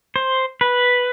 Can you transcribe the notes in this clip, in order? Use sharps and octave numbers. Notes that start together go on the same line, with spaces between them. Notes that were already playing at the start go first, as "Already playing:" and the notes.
C5
B4